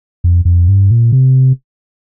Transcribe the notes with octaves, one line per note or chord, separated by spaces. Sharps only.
F2
F2
G2
A#2
C3